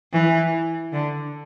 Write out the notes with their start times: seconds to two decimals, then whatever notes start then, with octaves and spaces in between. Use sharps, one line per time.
0.13 E3
0.93 D3